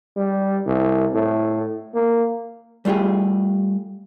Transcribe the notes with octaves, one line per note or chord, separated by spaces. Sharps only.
G3
C2
A2
A#3
G3 A3 F4 G4 G#4